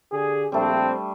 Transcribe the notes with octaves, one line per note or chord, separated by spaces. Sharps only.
D3 G4 G#4
A#1 G3 A3 C4 D4